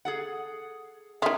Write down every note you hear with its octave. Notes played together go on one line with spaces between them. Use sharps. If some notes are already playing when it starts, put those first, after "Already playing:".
G#4 A4 F#5
D#3 F4 G#4 E5